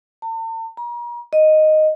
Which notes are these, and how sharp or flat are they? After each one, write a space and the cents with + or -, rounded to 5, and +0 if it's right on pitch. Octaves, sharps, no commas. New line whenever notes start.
A5 +45
A#5 +40
D#5 -5